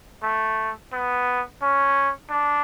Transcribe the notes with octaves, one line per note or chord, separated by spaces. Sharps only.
A3
B3
C#4
D4